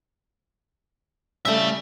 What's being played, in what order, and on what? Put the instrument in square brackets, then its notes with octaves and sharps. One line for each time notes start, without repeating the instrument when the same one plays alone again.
[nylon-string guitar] C#3 G3 A3 [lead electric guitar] A4 E5